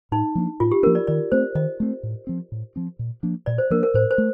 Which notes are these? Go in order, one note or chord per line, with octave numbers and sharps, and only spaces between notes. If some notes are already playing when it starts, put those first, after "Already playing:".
A2 D#4
F3 A#3 D4
A2 F4
G4
F3 A#3 D4 A#4
D5
D#3 D5
A3 C4 C5
D#3 D#5
A3 C4
A2
F3 C4
A2
F3 C4
A#2
F3 A#3 D4
A#2 D5
C5
F3 A#3 D4 A#4
A#4
A2 C5
C5
A3